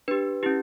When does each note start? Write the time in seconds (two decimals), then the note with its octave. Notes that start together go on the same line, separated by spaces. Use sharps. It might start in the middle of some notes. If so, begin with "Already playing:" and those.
0.08 D4 G4 B4
0.43 C#4 E4 G4